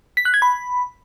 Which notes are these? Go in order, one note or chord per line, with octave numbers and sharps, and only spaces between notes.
B6
F#6
G#6
B5